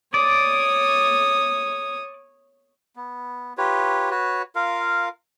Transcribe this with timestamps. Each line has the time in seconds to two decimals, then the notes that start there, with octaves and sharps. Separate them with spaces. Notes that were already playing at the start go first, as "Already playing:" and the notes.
0.14 C#5 D5 D#6
2.96 B3
3.58 F4 G4 B4 C#5
4.11 F#4 B4 C#5
4.55 F4 A#4 F5